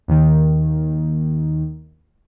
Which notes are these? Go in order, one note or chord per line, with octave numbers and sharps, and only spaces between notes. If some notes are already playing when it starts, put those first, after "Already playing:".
D#2 D#3